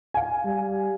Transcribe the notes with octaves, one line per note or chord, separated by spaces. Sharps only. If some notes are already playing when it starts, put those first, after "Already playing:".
F5 G#5
G3